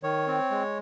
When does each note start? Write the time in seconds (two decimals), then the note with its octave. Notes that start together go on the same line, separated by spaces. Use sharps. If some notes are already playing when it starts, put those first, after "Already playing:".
0.03 D#3 C#5
0.27 C4
0.51 G#3